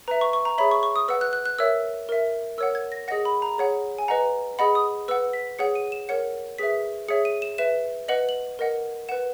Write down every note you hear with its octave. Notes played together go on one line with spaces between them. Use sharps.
B4 E5 A#5
C#6
C#6
A#5
G#4 C#5 E5 B5
C#6
C#6
D#6
B4 F#5 E6
F#6
F#6
F#6
A#4 C#5 E5 E6
A#4 E5
A#4 C#5 F#5 E6
G#6
A#6
G#4 D#5 F#5 A#6
B5
A#5
G#4 C#5 F#5
G#5
B4 D#5 F#5 A#5
G#4 D#5 F#5 B5
D#6
B4 F#5 E6
B6
G#4 C#5 F#5 C#7
D#7
E7
A#4 C#5 F#5 C#7
G#4 B4 E5 B6
G#4 C#5 E5 C#7
D#7
E7
B4 E5 E7
B4 D#5 F#5 F#7
F#7
A#4 D#5 F#5
B4 F#5 E7